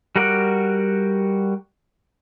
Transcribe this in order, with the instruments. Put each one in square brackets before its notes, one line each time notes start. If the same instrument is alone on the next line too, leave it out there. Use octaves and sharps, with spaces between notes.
[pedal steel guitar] G3 F#4 A#4 F#5 D6